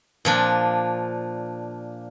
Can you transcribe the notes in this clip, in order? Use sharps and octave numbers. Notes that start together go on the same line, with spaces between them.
A#2 F3 D4